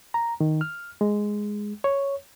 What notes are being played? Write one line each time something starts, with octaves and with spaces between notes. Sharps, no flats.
A#5
D#3
F6
G#3
C#5